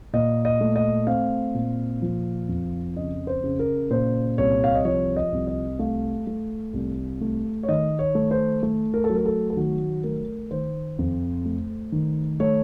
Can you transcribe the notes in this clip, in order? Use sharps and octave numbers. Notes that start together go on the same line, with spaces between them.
A#2 D#5
D#5
A3
D#5
C4 F5
A#2
F3
F2
C#3 D#5
C5
C#3
A#4
A#2 C5
C2 C#5
F5
D#5
F3 C#5
D#5
C2
D#5
A3 F5
A3
C2
A3
C#5
D#3 D#5
C#5
A3
C5
A3
A#4
A4
F#3
A#4
A4
A4
D#3 F#4
A3 A#4
D#3 C5
F2
A3
D#3
A3 C#5